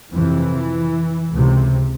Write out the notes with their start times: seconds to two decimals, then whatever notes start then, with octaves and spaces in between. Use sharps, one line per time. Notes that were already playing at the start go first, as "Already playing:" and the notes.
0.11 F2 C3 E3
1.31 C#2 C3